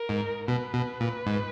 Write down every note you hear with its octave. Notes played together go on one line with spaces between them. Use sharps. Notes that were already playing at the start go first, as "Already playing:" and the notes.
Already playing: A#4
G#2
B2 B4
B2
A#2
G#2